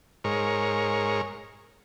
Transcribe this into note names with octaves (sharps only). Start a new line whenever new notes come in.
G#2 A#4 C#5